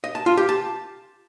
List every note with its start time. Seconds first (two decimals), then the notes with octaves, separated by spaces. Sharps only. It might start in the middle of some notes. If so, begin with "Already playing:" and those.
0.04 D#5
0.15 A5
0.26 F4
0.37 G4
0.49 A5